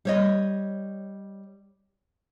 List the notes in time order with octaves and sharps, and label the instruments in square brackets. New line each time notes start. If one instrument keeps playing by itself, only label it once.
[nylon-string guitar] G3 C#5 D#5